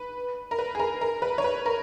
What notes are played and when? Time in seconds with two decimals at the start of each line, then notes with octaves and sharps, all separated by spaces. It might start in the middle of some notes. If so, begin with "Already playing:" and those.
Already playing: B4
0.51 A#4
0.59 B4
0.75 G#4
0.79 A#4
1.01 A#4
1.22 B4
1.38 C#5
1.44 B4
1.66 A#4